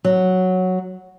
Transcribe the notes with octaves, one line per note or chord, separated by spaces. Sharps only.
F#3